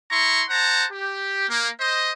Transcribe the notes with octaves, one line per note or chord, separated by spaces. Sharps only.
E4 A#5 C6 C#6
C5 F#5 A5 A#5
G4
A#3
C5 D#5